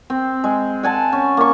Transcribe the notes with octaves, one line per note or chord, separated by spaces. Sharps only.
C4
G#3
F#5 G#5 A5
C#4
A#3 C#6